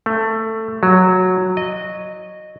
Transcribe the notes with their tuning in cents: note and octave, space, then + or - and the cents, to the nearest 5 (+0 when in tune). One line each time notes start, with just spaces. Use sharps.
A3 +15
F#3 -5
D#5 -15